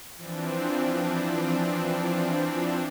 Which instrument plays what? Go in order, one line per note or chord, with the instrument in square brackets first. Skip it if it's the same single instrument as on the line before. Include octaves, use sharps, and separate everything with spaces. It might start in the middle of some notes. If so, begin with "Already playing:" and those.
[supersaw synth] E3 F3 C4 D4